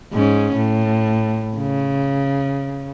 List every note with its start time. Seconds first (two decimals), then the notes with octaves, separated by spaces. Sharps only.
0.13 G#2 C#4
0.56 A2
1.57 C#3